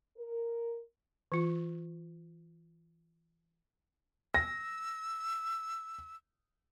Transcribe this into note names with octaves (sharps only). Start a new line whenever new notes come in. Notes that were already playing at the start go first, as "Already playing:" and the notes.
A#4
E3 F4
E6 A#6